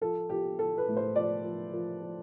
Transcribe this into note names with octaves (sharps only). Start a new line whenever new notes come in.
F3 A4
F3 G4
F3 A4
B4
A2
C5
F3 D5
F3
F3
F3